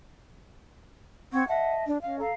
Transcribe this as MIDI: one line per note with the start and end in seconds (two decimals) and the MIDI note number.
1.33 1.46 60
1.33 1.47 78
1.33 1.47 85
1.33 1.47 92
1.48 1.83 75
1.48 1.83 76
1.48 1.73 78
1.48 1.83 81
1.87 1.98 62
2.02 2.19 61
2.02 2.19 75
2.02 2.19 77
2.19 2.30 69
2.19 2.32 77
2.19 2.32 82